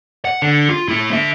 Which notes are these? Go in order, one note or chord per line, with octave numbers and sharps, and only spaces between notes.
F#5
D3
F4
A3 E4
D3 E5